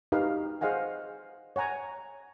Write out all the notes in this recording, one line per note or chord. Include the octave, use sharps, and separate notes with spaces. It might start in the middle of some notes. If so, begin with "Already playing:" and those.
D#4 F#4 G4 A#4 B4 F5
G#4 C5 D#5 F5 F#5 G#5
C#5 F#5 G#5 A#5